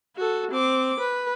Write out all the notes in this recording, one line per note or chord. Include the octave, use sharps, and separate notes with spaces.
F#4 A4
C4 D6
B4